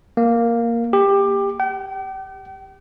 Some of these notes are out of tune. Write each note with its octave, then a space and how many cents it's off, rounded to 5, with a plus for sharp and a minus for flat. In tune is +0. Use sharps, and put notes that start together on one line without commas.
A#3 +0
G4 +20
G5 -40